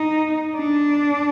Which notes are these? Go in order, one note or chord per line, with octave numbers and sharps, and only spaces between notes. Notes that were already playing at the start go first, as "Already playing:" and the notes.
Already playing: D#4
D4